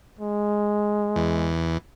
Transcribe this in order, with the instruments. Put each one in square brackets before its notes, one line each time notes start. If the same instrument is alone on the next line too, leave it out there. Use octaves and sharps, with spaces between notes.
[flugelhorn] G#3
[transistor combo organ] E2